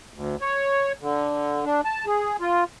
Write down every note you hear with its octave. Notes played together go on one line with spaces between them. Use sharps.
D2
C#5
D3
D4
A5
G#4
F4